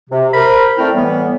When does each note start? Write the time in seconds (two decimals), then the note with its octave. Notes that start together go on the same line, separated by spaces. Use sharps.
0.10 C3
0.34 A#4 C5 B5
0.78 A3 C4 E4 D5 G5 F6
0.94 A2 E3 G3 B3